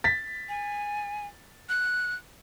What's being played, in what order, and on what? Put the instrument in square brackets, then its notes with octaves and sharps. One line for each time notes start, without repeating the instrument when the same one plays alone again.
[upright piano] A6 B6
[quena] G#5
F#6